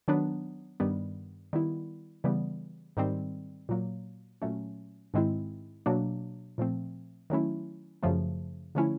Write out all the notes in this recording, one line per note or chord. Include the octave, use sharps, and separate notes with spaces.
D#3 F#3 B3 D4
G2 D#3 G3 B3
D#3 G3 B3 E4
C#3 E3 G3 B3
G#2 D#3 G3 C4
A#2 F#3 A#3
A#2 F#3 A3 C#4
G#2 D#3 G#3 C4 E4
B2 F#3 A#3 D4
A#2 F3 A3 C4
D#3 F#3 A3 C#4 E4
F#2 C#3 F3 A3
D3 F3 A3 C#4 E4